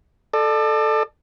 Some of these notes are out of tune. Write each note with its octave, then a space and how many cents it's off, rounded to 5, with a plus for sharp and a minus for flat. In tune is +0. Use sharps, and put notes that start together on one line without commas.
A4 +0 D5 +35